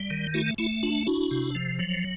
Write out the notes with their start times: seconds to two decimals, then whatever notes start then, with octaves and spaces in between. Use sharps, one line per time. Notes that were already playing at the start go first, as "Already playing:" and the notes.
Already playing: G3
0.10 D#3
0.34 A3 E4 F#4
0.58 A3 E4
0.83 D4 F4
1.07 D4 E4 F#4
1.31 C3
1.55 F3
1.79 F#3